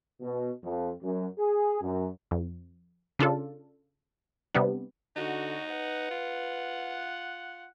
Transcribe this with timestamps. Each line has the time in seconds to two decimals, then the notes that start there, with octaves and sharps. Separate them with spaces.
0.21 B2
0.64 F2
1.03 F#2
1.38 G#4
1.82 F#2
2.31 F2
3.19 C#3 D4 F4 A4
4.55 C3 G3 B3 D4
5.16 D3 D#4 F#4
5.70 B4 F#5
6.11 F4